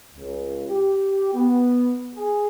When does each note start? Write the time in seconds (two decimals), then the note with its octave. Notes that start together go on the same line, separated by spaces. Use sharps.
0.14 C#2
0.68 G4
1.34 B3
2.15 G#4